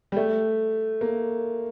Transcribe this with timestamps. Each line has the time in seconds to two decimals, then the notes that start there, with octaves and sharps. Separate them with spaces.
0.12 G3
0.17 A3
1.01 A#3